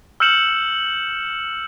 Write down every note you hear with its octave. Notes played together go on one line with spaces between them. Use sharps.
E6 F6 G6 C#7 E7 F#7